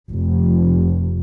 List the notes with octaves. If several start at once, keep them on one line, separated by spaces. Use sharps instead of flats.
F1